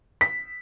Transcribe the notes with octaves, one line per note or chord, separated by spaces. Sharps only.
B6